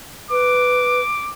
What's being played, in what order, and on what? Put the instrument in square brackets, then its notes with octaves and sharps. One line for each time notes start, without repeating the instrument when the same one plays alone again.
[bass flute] B4 [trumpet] D6